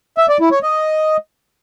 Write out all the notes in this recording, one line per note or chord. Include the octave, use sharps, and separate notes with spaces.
E5
D5
E4
C#5
D#5